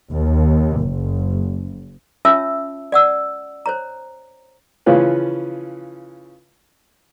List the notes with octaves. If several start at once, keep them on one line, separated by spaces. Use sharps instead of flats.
D#2
F#1
C#4 F4 C#5 E5 A5 E6
D5 F#5 E6
C5 C#5 A#5
C#3 E3 F3 C#4 F4 B4